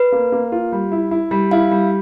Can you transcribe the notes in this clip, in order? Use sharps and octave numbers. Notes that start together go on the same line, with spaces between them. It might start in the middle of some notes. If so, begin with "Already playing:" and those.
Already playing: B4
A#3
A#3
F4
G3
E4
E4
G3
E4 F5
G3